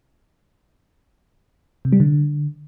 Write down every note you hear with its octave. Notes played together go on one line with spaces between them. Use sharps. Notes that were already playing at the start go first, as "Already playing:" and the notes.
C3
G3
D3